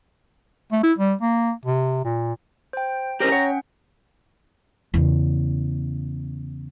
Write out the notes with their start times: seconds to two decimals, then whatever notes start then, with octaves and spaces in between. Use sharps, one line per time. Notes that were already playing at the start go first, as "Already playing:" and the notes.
0.72 A3
0.83 E4
0.98 G3
1.21 A#3
1.65 C3
2.04 A#2
2.73 C5 G5
3.20 C#4 G4 A#4 C5 G5 A#5
3.32 C#5 F#5
4.94 E2 C#3